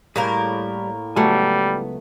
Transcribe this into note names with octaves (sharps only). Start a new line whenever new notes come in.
A2 G3 A#3 G#4 A#4
C#2 F#3 G3 A3 B3 G#5